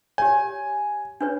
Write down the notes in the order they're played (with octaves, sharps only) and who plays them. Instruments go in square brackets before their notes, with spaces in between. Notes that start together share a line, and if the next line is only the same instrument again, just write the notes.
[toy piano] G4 C#5 [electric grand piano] G#5
[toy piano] D4 B4 C#5